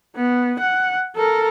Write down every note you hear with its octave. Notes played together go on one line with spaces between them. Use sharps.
B3
F#5
A4 A#4